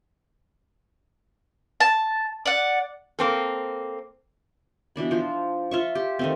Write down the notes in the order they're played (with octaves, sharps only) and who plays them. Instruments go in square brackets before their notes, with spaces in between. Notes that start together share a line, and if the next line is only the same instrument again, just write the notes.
[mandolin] A5
D5 F#5
[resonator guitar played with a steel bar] A#3 C4 A4
[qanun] B2 E3 D4 B5
F3 C5
F4 E5 C#6
G4
D#3 A3 C4